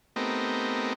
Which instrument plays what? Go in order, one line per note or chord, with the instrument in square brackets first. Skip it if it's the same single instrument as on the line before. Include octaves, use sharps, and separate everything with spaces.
[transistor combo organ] A3 B3 C4 D#4 G4 A#4